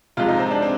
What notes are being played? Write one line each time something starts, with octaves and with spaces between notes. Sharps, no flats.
C3 F3 G#3 F4
D#4
C4
D4
C4